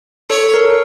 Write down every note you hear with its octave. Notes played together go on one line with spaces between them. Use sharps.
A4 C#5
A#4